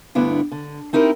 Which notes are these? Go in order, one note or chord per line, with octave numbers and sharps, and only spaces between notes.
D2 G2 B3 D4 E4
D3
C4 D#4 E4 G4 A#4